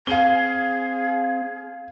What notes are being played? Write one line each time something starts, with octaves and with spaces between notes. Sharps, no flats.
C4 G#4 F5 G7